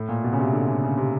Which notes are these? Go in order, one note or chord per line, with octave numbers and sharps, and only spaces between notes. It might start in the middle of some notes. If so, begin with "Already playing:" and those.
Already playing: A2
A#2
B2
C#3
C3
D3
C#3
C#3
C3